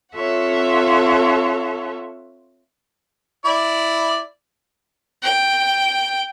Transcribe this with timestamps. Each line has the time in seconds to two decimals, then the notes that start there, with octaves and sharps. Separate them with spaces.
0.14 C4 F4 A4 C#5 E5 F#5
3.45 E4 D5
5.22 G5